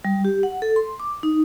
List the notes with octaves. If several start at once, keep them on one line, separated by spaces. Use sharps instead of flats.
G3
G4
F#5
A4
C6
D6
D#4